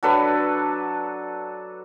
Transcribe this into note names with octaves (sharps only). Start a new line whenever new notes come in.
F#3 D4 A4 B4